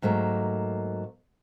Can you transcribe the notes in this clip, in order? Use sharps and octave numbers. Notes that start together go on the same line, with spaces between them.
G#2 F#3 A3 A#3